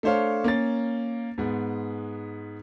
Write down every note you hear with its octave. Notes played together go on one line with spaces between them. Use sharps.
A3 D4 C5 C#5 F5
A#3 C#4 A6
G#2 G#3 B3